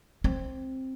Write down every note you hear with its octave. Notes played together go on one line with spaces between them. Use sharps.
C4